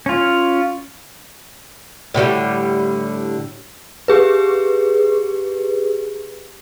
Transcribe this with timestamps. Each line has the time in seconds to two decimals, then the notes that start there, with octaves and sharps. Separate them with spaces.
0.06 C#4 F4
2.14 A2 D3 F#3 G3
4.08 G4 G#4 B4